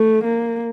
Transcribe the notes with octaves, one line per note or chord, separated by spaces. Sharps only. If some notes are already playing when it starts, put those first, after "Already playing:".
Already playing: A3
A#3